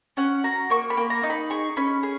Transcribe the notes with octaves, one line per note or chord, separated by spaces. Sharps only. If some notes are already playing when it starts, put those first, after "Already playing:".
C#4 F#5
F#4 A#5
A#3 C#6
B5
A#3
A#5
D#4
B5
G#4 C#6
C#4 B5
G#4